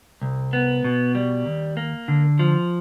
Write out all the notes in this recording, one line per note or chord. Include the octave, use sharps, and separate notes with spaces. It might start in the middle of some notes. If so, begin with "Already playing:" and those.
C2
B3
B2
G3
D#2
A#3
D3
F3